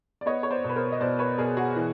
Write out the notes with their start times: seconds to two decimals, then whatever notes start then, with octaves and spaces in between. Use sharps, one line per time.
0.21 D5
0.26 B3 C#5 D#5
0.43 C#5
0.51 C5 D5
0.64 B2
0.69 B4
0.76 A#4 C5
0.92 D#5
1.00 B2 C5 D5
1.19 B4 C#5
1.38 B2 G#4 A#4
1.57 F#4 G#4
1.76 E3